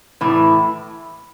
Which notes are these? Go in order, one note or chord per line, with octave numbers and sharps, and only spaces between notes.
A2 E3